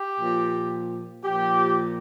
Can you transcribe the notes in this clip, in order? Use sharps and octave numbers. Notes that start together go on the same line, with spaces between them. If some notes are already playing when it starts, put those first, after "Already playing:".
Already playing: G4
A#2 F3
A#2 F3 G4